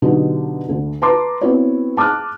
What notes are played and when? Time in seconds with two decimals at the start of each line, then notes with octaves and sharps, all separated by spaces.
0.02 B2 D3 F#3 D#4 F#4 G4
0.69 D2 D3
1.02 B4 A5 A#5 C6 D6
1.41 B3 C4 E4 F#4 B4 C#5
1.97 A5 D6 D#6 F6 F#6